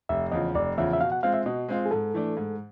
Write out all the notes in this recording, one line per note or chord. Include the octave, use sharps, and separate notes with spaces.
F1 E5
E2 C#3 F3 D#5
F1 D5
E2 C#3 F3 E5
E5
B2 F5
F#5
G#3 C4 F4 F5
E5
B2 D#5
G#3 C4 F4
G#4
G#2 A4
E3 A3 D4
G#2